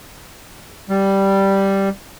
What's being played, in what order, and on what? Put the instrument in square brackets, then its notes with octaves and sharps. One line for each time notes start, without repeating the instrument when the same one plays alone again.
[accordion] G3